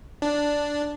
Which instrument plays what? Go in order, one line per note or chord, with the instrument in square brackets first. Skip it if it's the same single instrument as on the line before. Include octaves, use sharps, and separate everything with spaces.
[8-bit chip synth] D4